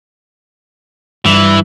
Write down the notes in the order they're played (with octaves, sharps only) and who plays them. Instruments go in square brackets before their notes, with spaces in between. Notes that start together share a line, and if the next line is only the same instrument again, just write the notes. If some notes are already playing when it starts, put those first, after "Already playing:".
[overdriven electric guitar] G2 [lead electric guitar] E3